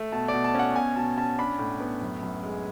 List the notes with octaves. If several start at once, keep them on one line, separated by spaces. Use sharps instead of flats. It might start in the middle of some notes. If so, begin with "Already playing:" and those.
Already playing: A3
B2 A5
D5
B2
A5
C#4 F#5
B2 G#5
B2 A5
C#4 A5
D4 B5
A2
B3
F#2
F#2
G#3